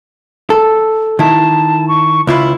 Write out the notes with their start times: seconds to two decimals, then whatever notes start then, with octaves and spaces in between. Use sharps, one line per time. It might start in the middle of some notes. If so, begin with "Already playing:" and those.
0.50 A4
1.19 D#3 E4 A5
1.88 C#6
2.27 C#2 E4 F4 B5